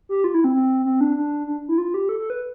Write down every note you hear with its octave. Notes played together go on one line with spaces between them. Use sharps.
G4
F4
E4
C4
C4
C4
D4
D4
D4
E4
F4
G4
A4
A4
B4